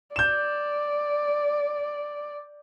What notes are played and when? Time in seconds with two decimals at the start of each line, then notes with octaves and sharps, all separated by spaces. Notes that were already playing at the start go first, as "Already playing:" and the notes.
0.16 D5 G6 E7